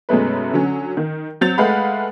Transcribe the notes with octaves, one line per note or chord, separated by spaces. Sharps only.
F#2 B2 G#3 A3 B4
D3 F#3 C#4
D#3
F#3 C4 G6 A6 F7
G#3 A3 B4 F5 F#5 B5